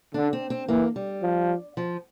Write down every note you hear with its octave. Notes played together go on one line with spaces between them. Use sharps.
D3 D4
C4
C4
E3 A#3
G3
F3
F3